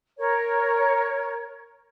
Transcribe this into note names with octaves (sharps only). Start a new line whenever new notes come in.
A#4 C#5